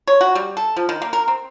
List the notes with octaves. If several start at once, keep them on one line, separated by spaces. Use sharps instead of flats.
C#5
F#4
G3
A4
F3
D#3
A#3
A#4
C4